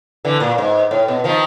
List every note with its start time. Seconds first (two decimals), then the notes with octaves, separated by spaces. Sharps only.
0.25 D3 E3
0.40 A#2
0.58 G#2
0.91 A2
1.08 B2
1.24 D#3 F3